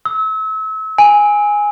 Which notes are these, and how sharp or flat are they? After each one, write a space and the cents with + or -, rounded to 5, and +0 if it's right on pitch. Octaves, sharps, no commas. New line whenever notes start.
E6 -35
G#5 -5